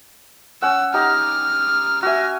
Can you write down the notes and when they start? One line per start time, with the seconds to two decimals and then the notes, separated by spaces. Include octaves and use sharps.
0.62 C#4 F#5 E6
0.94 D#4 G4 A#5 F6
2.03 F#4 E5 G#5 F6